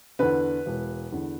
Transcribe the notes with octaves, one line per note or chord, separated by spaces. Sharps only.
E2 D3 B4
E1
E2 D3